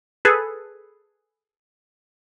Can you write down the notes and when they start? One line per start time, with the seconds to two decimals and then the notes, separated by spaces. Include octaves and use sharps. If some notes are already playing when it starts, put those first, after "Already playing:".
0.25 G#4 A4 B4